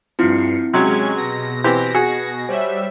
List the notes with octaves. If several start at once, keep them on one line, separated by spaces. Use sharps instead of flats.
G2 F3 C4 E4 C7 C#7
C3 F#3 G#3 C#4 G#4 C6 G#6
B2 A#6
E3 C4 G4
F#4 G#4 C#7
G3 C5 C#5 E5